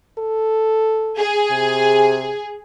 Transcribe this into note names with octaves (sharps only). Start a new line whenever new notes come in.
A4
G#4
C3